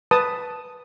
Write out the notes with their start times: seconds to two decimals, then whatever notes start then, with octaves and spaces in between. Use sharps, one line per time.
0.11 B4 A5 D#6